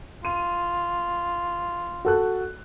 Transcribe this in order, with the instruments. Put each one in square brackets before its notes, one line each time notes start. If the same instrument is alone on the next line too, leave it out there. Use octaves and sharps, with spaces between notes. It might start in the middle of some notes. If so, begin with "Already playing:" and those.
[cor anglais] F4 [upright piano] D#7
[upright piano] F#4 A4 F#6